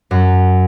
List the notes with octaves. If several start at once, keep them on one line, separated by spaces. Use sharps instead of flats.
F#2